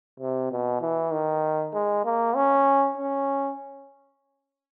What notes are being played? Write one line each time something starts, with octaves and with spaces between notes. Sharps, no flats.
C3
B2
E3
D#3
G#3
A#3
C#4
C#4